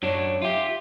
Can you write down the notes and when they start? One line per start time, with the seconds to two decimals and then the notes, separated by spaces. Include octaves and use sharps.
0.03 F#2 F#3 D4 C#5
0.42 F4 G4 E5